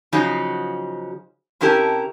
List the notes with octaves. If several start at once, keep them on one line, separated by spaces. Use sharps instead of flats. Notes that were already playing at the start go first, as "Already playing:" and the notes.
C#3 F3 F#3 D#4 F#4
C3 C#4 E4 G4 A#4 A5